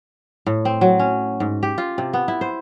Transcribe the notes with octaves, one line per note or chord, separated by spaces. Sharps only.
A2
C4
F#3
C#4
G#2
G4
F4
C3
B3
E4
C5